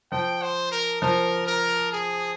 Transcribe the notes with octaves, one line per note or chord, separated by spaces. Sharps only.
F3 G5
C5
A#4
F3 A#4
A#4
G#4